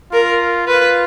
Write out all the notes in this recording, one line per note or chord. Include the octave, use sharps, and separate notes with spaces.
F4 A#4
F4 B4